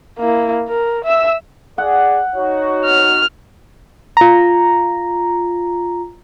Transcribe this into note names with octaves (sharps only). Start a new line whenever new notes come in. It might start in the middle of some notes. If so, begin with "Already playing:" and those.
A#3 E4
A#4
E5 E6
G#4 D5 F#5
D#4 F#4 C#5
F6
F4 A#5